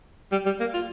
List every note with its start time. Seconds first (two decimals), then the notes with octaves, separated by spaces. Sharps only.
0.32 G3
0.46 G3
0.60 A#3
0.74 F4